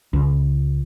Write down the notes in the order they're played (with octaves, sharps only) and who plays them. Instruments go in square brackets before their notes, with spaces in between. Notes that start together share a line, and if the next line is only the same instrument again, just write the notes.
[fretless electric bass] C#2